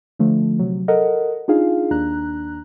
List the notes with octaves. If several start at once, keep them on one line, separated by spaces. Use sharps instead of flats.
D3 F3 A3
C3 F#3
A4 A#4 D#5 F#5
D4 D#4 F4 G#4 F5
D#2 D4 A#5 F#6